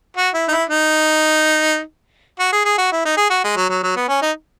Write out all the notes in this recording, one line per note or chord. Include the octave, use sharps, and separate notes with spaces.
F#4
E4
D#4
E4
D#4
F#4
G#4
G#4
F#4
E4
D#4
G#4
F#4
G#3
F#3
F#3
F#3
B3
C#4
D#4